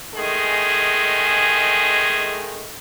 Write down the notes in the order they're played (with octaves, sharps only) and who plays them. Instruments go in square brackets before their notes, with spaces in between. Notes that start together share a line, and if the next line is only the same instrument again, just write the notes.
[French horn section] D#3 G#3 A3 G#4